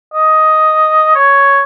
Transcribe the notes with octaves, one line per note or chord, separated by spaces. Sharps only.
D#5
C#5